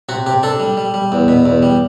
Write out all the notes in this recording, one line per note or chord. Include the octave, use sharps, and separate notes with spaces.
C3 F#4
C3 G4
D4 A4
G3
G3
G3
E2
B2
E2
G3